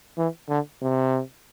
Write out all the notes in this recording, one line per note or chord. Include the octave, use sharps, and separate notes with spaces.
E3
D3
C3